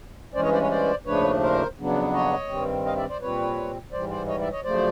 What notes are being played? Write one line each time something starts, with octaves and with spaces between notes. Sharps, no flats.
G2 E3 G#3 C#4 C5 D5
C#5 D#5
C5 D5
B4 C#5
C5 D5
D#2 C#3 F3 A3 D4 B4 C#5
A#4 C5
F2 C#3 F#3 B3 D4
C#5 D#5
G2 D#3 G3 C4
D#5 F5
D5 E5
C5 D5
A#2 G3 C4 B4 C#5
G#2 E3 G3 C5 D5
C5 D5
C#5 D#5
D5 E5
C#5 D#5
F#2 C#3 F3 A3 C5 D5